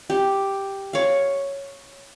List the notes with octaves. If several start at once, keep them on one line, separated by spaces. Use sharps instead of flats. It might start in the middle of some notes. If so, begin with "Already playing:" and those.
G4
C#5 F5